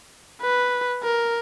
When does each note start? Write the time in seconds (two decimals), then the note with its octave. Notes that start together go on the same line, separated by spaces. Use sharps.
0.41 B4
1.03 A#4